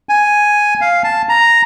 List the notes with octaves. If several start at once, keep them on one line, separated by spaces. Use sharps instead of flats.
G#5
F5
A5
A#5